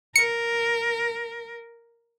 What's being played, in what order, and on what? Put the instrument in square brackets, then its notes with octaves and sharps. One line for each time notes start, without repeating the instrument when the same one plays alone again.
[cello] A#4 [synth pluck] C#7